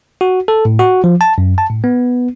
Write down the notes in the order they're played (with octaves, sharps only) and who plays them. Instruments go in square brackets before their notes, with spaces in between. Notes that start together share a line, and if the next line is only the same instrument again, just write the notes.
[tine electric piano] F#4
A4
A2
F#4
F3
A5
F#2
A5
A2
B3